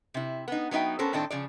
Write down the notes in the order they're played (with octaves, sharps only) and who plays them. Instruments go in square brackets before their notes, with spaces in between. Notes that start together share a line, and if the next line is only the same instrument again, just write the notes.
[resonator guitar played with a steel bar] C3 E4
B3 D#4
F#3 B3 D#4 E5 G5
B3 C#4 A4 A#4 C5
A2 D#3 C4 D4 A4
C#3 F3 D5